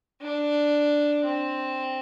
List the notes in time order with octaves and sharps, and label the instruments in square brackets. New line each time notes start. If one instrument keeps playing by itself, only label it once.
[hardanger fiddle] D4
C4